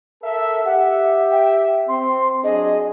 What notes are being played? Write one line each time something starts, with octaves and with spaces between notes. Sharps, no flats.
A4 A#4 E5
G4 E5 F#5
G5
C4 C6
F#3 D4 G#4 D#5